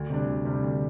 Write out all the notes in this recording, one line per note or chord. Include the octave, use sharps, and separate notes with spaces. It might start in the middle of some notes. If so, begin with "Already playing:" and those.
Already playing: D2
C3 G3 D4
D2
C3 G3 D4
D2